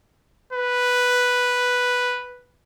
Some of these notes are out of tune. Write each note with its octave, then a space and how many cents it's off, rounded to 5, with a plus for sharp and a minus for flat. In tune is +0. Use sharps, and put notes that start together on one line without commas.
B4 +0